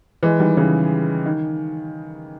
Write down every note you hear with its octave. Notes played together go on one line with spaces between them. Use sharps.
E3 G#3
D#3 G3
C#3 E3
D#3